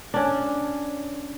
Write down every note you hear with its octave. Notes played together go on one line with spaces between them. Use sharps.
C#4 D4